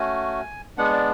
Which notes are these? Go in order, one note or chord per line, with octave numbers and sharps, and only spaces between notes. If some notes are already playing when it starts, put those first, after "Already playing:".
Already playing: A3 C#4 F#4 G#5
G#3 B3 D4 F#5
D5